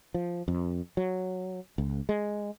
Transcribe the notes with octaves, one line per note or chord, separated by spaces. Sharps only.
F3
F2
F#3
C#2
G#3